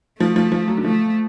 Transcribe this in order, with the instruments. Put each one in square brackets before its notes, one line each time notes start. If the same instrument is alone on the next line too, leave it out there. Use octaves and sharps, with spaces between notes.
[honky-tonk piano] F3 [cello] A3
[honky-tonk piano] F3
F3
F#3
D3
[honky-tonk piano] F3 [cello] A3